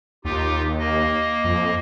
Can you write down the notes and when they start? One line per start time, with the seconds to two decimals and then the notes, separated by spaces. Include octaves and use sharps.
0.25 D#2 D#4 F4 G4
0.79 A#3 D#5
1.44 F2